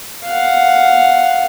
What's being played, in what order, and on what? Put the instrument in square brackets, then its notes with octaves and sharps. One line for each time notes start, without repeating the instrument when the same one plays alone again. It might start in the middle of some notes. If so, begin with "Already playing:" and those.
[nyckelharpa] F5 F#5